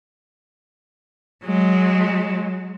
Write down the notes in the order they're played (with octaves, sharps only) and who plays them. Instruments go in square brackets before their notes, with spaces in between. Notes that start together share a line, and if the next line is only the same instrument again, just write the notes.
[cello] F#3 G#3